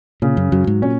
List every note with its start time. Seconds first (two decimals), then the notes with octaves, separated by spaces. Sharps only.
0.22 A#2 C#3
0.37 F#2
0.52 F#2 F#3
0.67 G#2
0.82 A#2 C#4